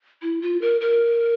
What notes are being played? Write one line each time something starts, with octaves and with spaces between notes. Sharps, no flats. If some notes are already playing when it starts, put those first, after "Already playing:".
E4
F4
A#4
A#4